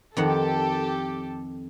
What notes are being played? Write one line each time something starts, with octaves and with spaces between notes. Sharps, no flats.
F2 D#3 G4 A4 F#5